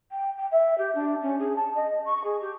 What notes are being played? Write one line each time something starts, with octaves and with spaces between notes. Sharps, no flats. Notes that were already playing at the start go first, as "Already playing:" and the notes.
G5
G5
E5
G4
D4
C#4
G#4
A5
D#5
C#6
G#4
G4